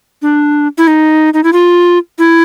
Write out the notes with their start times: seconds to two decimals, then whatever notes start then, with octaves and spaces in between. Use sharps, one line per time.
0.22 D4
0.78 E4
0.87 D#4
1.34 D#4
1.44 E4
1.53 F4
2.19 E4